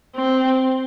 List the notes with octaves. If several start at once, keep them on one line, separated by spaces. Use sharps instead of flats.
C4